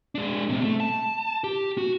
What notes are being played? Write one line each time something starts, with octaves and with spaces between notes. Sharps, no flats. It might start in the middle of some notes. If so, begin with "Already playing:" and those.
G#3 D4
B2 C4
A3
A5
G4
F#4